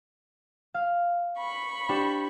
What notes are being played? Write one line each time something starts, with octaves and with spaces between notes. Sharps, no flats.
F5
B5 C#6
D4 G4 C5